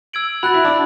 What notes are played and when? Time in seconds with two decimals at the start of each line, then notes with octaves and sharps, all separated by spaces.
0.13 E6 G#6 D7 F#7
0.43 F#4 B5 F#6 A6
0.54 E4
0.64 D4